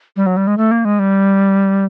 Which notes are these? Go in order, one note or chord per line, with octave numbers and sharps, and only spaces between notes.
G3
F#3
G3
G#3
A3
A#3
G#3
G3